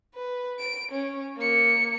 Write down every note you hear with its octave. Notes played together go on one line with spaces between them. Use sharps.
B4
D7
C#4
A#3 C#7